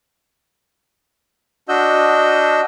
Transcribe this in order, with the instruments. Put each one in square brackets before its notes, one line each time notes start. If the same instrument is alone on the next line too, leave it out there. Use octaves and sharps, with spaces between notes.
[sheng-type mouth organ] D4 F#4 D#5 E6 G6